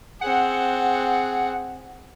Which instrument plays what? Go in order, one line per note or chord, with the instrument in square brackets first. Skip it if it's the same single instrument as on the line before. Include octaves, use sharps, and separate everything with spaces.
[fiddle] C4 G#4 [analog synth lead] F#5